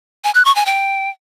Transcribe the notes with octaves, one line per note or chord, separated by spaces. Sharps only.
G#5
F#6
C#6
G#5
G5